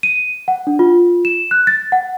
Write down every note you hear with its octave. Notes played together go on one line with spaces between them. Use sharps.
D#7
F#5
D4
F4
E7
F#6
A6
F#5